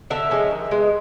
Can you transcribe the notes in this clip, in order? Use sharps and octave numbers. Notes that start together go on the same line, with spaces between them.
D3 E5
F3 G#3 C#4
D#3
G#3 B3